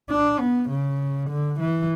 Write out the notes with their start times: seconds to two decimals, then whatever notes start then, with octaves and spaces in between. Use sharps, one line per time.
0.09 D4
0.39 B3
0.69 C#3
1.29 D3
1.59 E3